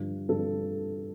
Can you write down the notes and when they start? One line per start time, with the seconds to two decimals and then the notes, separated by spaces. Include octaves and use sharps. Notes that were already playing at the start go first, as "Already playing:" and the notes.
Already playing: G2 D3 F3
0.29 G2 D3 F3 A4